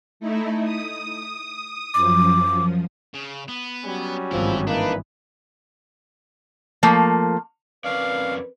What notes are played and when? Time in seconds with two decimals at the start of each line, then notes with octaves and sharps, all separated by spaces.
0.20 A3 D#4 E4
0.64 D#6
1.94 F#2 F3 D6
3.14 C#3
3.48 B3
3.84 F#3 G3 C#4
4.31 G#1 G2 E3 F3 E4
4.67 E3 A#3 D4 D#4 B4
6.83 F3 A3 A#3
7.85 F2 C4 C#4 A#4 B4 D5 F5